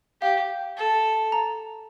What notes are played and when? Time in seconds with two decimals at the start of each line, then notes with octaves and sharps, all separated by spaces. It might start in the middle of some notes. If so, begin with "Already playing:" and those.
0.21 G4 F5
0.77 A4
1.32 A#5